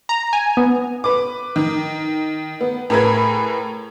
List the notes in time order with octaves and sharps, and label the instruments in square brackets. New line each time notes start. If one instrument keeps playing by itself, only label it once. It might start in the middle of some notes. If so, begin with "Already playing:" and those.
[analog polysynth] A#5
G#5
B3
[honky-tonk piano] B4 D6
D#3
B3
A2 G#4 A#4 B4 B5 G#6